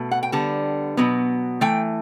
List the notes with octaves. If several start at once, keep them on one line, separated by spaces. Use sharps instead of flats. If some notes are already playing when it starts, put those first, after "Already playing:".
Already playing: B2 A3
F#5
G5
D3 G3 B3 A5
B2 F#3 B3
E3 A3 G5